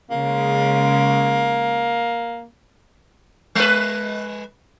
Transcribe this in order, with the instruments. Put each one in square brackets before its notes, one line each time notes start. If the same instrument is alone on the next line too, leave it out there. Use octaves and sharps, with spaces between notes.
[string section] C#3 G#3 [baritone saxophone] A#3
[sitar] G#3 B4